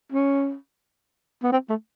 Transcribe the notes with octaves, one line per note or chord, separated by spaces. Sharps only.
C#4
B3
C4
A3